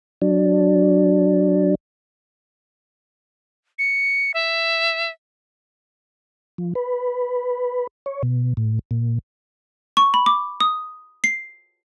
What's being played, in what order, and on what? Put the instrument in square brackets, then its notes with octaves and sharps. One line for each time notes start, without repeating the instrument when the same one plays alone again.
[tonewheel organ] F#3 D4
[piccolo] C#7
E5
[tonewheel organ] F3
B4
C#5
B2
A2
A#2
[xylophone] C#6
B5
D6
D#6
C7